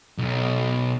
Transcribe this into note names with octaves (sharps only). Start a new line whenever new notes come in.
B1